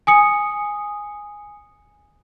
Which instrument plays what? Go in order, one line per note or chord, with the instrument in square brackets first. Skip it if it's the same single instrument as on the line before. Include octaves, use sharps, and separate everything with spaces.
[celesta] G#5 D#6 C#7